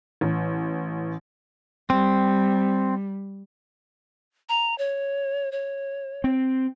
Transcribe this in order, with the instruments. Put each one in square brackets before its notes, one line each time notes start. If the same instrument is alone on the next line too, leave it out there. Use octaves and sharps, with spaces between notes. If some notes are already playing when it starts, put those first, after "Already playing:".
[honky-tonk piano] A1
[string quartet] G3 [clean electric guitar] C4
[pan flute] A#5
C#5
C#5
[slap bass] C4